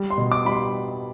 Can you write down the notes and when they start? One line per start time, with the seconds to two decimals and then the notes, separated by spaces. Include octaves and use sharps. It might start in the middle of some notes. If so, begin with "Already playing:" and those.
Already playing: G3
0.10 C6
0.18 B2
0.32 D6
0.45 G3 B5
0.52 C6